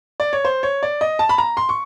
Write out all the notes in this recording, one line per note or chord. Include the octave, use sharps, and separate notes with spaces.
D5
C#5
C5
C#5
D5
D#5
A5
B5
A#5
C6
C#6